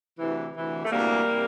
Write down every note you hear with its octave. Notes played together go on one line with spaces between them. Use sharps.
D2 C3 E3
D2 C3 E3
A3
D2 C3 E3 G3 A#3
C3 E3